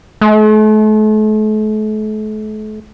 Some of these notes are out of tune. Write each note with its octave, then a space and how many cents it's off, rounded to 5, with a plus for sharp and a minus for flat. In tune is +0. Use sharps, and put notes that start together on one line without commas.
A3 -40